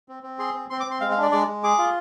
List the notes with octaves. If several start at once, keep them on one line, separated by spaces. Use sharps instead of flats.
C4
C4
G#4 C6
C4
C4 C6
D6
C4 C6
G#3 F5
F5
D4 D5
G#3 D5
G#3
G#4 D6
F4